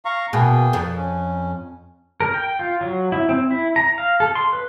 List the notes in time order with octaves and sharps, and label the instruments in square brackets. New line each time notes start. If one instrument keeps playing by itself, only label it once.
[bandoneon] F5 A#5 C#6
[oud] B2 [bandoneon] A#3 G#4 G5
[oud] F2
[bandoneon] C#4
[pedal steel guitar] A#4
G5
F4
F#3
E4
C4
E4
A#5
F5
A4
C6
B4